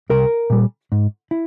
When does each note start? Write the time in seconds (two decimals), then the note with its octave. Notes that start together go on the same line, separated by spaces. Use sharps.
0.10 C2 A#4
0.50 A#2 G3
0.92 G#2
1.31 E4